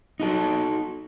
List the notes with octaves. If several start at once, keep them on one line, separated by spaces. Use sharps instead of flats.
D#4 F#4 A4